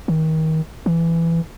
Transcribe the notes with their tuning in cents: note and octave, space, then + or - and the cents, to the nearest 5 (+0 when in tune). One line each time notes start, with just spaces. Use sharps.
D#3 +30
E3 +15